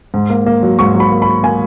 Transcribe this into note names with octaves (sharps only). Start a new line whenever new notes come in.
G#2
A#3
A#3
F#3
G#2 C#6
F#3
B5
A#3
B5
A#3
A#3 G#5